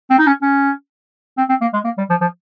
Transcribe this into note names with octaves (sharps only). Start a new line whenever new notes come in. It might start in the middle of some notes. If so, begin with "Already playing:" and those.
C4
D#4
C#4
C#4
C4
C4
A#3
G#3
A#3
G3
F3
F3